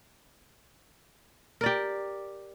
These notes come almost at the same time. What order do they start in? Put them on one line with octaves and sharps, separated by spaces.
A#4 D5 G4